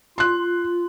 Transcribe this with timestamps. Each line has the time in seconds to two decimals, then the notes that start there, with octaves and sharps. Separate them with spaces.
0.18 F4 C6 F#6